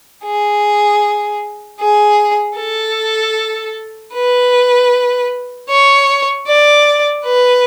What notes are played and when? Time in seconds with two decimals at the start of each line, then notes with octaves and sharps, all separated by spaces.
0.23 G#4
1.79 G#4
2.56 A4
4.13 B4
5.68 C#5
6.47 D5
7.25 B4